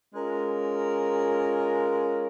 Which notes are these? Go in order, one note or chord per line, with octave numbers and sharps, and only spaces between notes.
G#3 C#4 F4 A#4